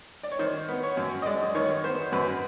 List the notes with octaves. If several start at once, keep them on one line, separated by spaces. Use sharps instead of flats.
D5
C#5
D#3 C5
B3
C#5
F#2
D#5
G#3 D5
D#3 C#5
B3 C5
F#2 B4